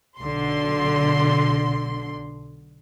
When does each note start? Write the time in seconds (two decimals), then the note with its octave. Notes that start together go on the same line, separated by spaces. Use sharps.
0.20 B1 D3 C6